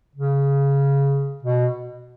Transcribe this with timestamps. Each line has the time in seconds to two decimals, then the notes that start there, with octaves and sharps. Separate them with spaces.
0.16 C#3
1.43 B2